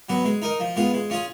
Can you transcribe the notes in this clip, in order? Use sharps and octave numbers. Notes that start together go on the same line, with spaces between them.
F#3 B3 F#4
G#3
D#4 A#4 D#5
F3
G#3 B3 F4
G#3
C#4 F4 G#4